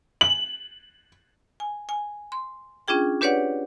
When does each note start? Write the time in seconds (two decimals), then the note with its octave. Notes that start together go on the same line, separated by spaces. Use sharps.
0.21 F#7
1.60 G#5
1.89 G#5
2.32 C6
2.88 C#4 D4 F4 G#4 G5
3.21 D4 G4 B4 C#5 D5 F#5